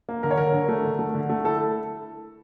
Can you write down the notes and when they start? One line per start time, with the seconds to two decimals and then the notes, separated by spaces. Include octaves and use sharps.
0.09 A#3
0.23 D3 A#4
0.31 C#5
0.37 D3 A#4
0.54 D3
0.68 A3
0.84 D3
0.99 A3
1.15 D3
1.29 A3
1.45 E4 A4